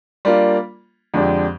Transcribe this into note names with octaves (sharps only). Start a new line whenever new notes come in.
G3 A#3 D4 F4
F2 D3 G#3 D4 G4